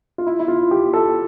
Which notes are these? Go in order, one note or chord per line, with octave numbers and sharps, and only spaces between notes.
F4
E4
E4
F4
G4
A4